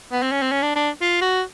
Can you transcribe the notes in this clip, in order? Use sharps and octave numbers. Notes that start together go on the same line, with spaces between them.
B3
C4
C#4
C4
C#4
D4
D4
F4
F#4